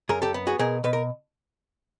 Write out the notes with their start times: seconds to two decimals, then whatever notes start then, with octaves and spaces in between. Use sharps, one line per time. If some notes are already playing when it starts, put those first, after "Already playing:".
0.09 F#2 G#4 A#4
0.22 G4 A4
0.34 B3
0.47 F#4 G#4
0.59 B2 G#4 A#4
0.84 B2 B4
0.93 A#4